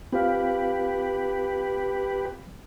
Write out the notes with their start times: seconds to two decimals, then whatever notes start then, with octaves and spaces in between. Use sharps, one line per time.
0.13 C4 F4 G4 B4 F5